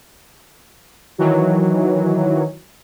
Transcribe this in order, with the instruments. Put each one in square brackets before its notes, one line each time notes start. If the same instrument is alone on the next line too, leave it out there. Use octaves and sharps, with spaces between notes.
[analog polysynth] D#3 E3 F#3